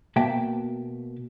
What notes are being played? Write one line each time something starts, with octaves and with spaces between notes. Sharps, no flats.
B2 A#3 E5 G5 A5